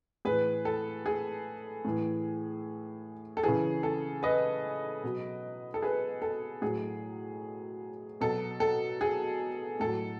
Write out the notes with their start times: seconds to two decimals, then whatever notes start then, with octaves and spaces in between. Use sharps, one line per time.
0.25 A2 E3 G#4 B4
0.65 A4
1.06 G#4
1.85 A2 E3
3.37 A4
3.43 C#3 E3 G#4
3.83 A4
4.23 B4 D#5
5.03 B2 F#3
5.74 A4
5.82 G#4 B4
6.22 A4
6.62 A2 F#3 G#4
8.21 B2 F#3 A4
8.60 A4
9.01 G#4
9.80 A2 F#3 A4